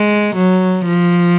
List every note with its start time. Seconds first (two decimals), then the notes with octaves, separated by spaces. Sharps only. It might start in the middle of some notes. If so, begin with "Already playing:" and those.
Already playing: G#3
0.35 F#3
0.86 F3